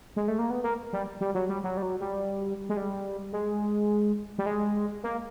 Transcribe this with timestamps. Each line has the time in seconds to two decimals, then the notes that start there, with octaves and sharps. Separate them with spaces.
0.16 G#3
0.28 A3
0.39 A#3
0.50 B3
0.64 A#3
0.93 G3
1.21 G3
1.35 F#3
1.49 G3
1.64 F#3
1.77 G3
1.82 F#3
2.01 G3
2.69 G#3
2.77 G3
3.33 G#3
4.38 G3
4.46 G#3
5.03 A#3